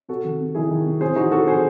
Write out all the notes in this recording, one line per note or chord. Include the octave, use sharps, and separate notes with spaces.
C3 F#4 A4
D#3
C3
D#3 E4 G#4
D#3
C3
E3 G#4 C5
E3 D#4 F#4
C3 F#4 A4
E3 G#4 C5